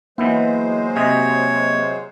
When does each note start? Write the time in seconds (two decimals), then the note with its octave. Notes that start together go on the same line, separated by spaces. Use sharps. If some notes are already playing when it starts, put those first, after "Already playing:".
0.18 E3 F#3 G#3 A#3 B3 E4 C5
0.96 C3 G#4 C#5 D#5